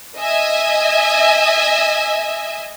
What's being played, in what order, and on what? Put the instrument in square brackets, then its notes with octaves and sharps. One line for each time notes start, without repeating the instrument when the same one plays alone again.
[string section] D#5 E5 G#5